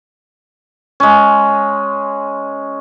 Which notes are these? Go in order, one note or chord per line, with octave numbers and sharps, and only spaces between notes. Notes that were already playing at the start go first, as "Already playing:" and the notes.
G#3 C#4